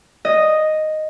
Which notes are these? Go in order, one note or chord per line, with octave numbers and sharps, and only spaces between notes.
D#5